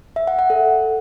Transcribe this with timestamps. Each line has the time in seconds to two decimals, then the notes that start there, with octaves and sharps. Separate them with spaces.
0.16 E5
0.27 F#5
0.39 F#5
0.50 A4